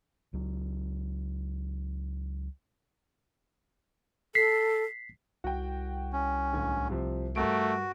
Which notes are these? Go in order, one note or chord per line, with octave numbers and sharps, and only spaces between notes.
C#2 F#3
A4 B6 C7
C2 F#4 G5
C#4
D1 D3 G#5
C3 F3
G2 A3 F#4 A#4 D7